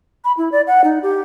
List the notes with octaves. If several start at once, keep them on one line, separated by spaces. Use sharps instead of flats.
B5
E4
D5
F#5
D#4
G4